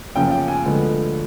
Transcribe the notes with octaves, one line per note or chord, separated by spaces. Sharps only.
F#2 C#3 F3 A#3 G5
G5
G#5
D2 D3 F3 G#3 B3